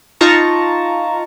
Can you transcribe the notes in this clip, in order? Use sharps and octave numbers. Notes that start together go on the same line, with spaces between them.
D#4 F4 A5 A#5 C#6